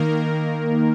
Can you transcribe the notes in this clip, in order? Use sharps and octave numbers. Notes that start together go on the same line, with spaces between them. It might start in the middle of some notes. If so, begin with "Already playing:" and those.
Already playing: D#3 A#3 A#4